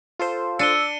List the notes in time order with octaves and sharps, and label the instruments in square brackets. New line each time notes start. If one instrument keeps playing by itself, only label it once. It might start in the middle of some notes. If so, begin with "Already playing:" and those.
[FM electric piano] F4 A4 C5
[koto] D4 [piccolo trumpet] E6 [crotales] C#7 D#7 G7